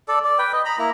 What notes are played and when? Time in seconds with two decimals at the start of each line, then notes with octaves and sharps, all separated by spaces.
0.08 A4 D5
0.24 D5
0.39 B4 G5
0.53 D#5
0.65 A#5 B5
0.79 A#3 E4 A#5